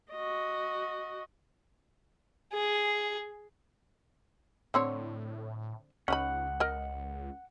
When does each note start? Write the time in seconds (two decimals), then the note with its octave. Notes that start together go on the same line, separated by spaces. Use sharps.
0.12 F#4 D#5
2.53 G#4
4.74 A2 D3 C4 C#5
6.08 C#2 C#4 D#4 F#5 B5
6.60 A#4 D#5